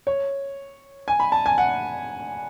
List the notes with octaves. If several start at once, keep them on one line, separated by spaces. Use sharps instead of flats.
C#5
G#5
B5
A5
G#5
F#5